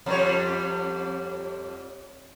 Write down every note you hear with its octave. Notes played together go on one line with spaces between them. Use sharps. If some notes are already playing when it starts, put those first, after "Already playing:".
F2 G3 C#5